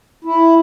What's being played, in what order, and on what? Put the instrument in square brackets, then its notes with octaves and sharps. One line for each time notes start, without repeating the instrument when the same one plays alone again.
[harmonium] E4